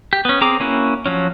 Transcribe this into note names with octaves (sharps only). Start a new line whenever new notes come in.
G4
B3 C#4
C4 G#4 A#5 D6
A#3 C#4 E4 F#4
F3 F#3 C#4